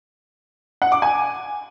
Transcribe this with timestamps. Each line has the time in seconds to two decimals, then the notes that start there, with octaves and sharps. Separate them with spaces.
0.82 F#5
0.92 D6
1.02 G#5